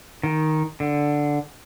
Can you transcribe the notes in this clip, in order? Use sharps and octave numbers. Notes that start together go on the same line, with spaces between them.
D#3
D3